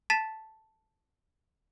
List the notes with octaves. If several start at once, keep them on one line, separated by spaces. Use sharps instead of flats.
A5 A6 B6 E7